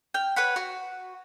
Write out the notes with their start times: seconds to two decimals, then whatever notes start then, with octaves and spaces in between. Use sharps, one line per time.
0.14 G5 F6
0.36 B4 C#5 F#5 B5
0.56 F#4